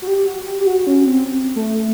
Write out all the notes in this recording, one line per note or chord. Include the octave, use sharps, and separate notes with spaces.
F#4
G4
F#4
G4
G4
F#4
C#4
C4
A3